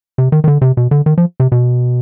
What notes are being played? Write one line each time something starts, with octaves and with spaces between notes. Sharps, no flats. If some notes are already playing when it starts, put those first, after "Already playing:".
C3
D#3
D#3
D3
C3
B2
D3
D#3
F3
C3
B2